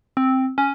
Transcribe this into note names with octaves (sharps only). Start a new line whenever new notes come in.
C4
C#4